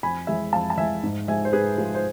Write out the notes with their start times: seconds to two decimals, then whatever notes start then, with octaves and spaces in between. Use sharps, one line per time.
0.03 F2 G#5 B5
0.27 E3 G#3 E5 G#5
0.53 F2 F5 A5
0.70 A5
0.77 E3 G#3 E5 G#5
1.03 G#2
1.28 F3 G#3 E5 G#5
1.45 C5
1.52 G#2 G#4 B4
1.78 F3 G#3
1.95 C5